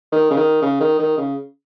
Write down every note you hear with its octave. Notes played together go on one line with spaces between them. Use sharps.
D#3
C#3
D#3
C#3
D#3
D#3
C#3